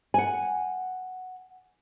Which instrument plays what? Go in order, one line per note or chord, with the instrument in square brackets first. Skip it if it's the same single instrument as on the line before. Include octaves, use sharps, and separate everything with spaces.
[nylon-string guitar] F#5 G#5